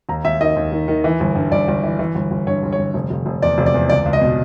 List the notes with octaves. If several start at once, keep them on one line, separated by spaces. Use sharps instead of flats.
D#2 A#5
D#2 E5
D#3 D#5
D#2
D#3
D#3
E3
G1
G2
G1 D5
G1
E3
E3
G1
G1
G2 C#5
G1
C#5
G1
F1
F1
F1
E2 D5
F1
D5
E2
C#2 D5
C#2
D#5
B2